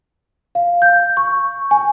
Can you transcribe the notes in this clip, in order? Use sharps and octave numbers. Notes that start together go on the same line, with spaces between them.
F5
G6
C#6
G#5